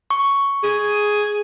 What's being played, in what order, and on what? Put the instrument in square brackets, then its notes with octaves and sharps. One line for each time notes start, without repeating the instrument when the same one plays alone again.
[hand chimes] C#6
[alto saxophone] G#4